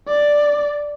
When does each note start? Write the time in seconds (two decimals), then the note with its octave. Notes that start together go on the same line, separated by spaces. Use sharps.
0.08 D5